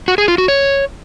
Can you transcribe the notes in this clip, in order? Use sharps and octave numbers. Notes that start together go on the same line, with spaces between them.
F#4
G#4
F4
F#4
C#5